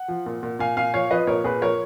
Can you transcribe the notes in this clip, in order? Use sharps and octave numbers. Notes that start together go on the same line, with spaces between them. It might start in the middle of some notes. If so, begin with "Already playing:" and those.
Already playing: F#5
F3
A#2
A#2
A#2 F5 G#5
A#2 F5 G#5
F3 C#5 F5
F3 B4 D#5
A#2 A#4 C#5
A#2 G#4 B4
F3 A#4 C#5